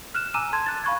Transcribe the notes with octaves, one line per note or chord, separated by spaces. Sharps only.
F6 F#6 E7
G#5 A#5 D6 E6 D#7 E7
A5 C6 G#6
F#6 A6
F5 B5 C#6 F#6 G#6